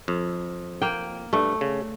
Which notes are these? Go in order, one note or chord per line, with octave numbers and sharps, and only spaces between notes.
F2
A#3 G5
G2 G3 A3
C#3